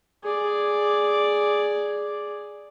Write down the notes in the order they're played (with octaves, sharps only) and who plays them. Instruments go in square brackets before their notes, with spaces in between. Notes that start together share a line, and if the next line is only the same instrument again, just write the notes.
[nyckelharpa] G#4 D5